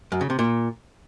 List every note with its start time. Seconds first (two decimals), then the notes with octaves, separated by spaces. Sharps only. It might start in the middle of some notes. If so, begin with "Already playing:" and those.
0.12 F#2
0.21 C#3
0.30 C3
0.39 A#2